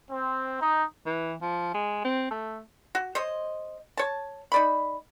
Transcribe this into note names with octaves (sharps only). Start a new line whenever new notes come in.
C4
D#4
E3
F3
G#3
C4
A3
F#4
C5 C#5 D#5
C#5 A5
D#4 D5 B5